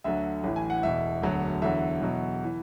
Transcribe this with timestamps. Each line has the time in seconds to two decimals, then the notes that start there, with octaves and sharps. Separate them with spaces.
0.04 D2 D3 F#3 E5
0.44 A1 A2 E3
0.56 G#5
0.70 F#5
0.83 E1 E2 B2 E5
1.22 E1 D2 D3 F#3
1.62 E2 D3 F#3 E5
2.01 E2 B2 F#3
2.44 E3